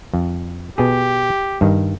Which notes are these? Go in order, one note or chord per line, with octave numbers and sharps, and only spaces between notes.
F2
B2 G4 G#4
G2 D#3